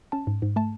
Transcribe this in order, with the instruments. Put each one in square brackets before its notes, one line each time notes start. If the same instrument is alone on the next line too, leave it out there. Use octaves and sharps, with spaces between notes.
[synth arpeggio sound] C#4 A5
G#2
G#2
A3 A5